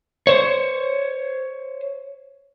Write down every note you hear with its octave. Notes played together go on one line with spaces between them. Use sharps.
C5 C#5